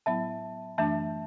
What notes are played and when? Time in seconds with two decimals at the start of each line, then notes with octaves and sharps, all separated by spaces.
0.06 A2 F#3 B3 E4 E5 A5
0.78 F#2 E3 A3 D4 E5 A5